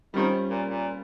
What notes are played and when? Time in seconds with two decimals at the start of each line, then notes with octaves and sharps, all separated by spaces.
0.14 D#3 G3 C#4 F4 C5
0.50 A#2
0.68 A#2